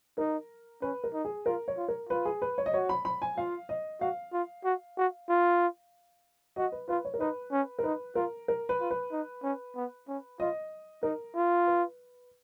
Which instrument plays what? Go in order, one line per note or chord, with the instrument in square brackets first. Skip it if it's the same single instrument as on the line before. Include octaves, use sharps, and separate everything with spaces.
[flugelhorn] D#4 [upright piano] A#4
[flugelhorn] C#4 [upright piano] B4
[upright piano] A#4
[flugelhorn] D#4
[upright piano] G#4
[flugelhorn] F4 [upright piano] A#4
[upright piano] C#5
[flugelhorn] F4
[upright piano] A#4
[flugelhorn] F4 [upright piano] B4
[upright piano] G#4
B4
C#5
D#5
[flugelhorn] F#4 [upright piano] C#5
[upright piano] B5
B5
G#5
[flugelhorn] F4 [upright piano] F5
[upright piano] D#5
[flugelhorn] F#4 [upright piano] F5
[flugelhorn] F4
F#4
F#4
F4
[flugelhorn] F#4 [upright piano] D#5
[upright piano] B4
[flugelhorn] F4 [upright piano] B4
[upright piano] C#5
A#4
[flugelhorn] D#4 [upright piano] B4
[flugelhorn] C#4
[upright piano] A#4
[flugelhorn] D#4 [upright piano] B4
[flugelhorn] F4 [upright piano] A#4
[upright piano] A#4
B4
[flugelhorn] F4
[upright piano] B4
[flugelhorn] D#4
C#4
B3
C#4
[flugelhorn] F4 [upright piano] D#5
[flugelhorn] D#4 [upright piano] A#4
[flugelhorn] F4
[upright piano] B4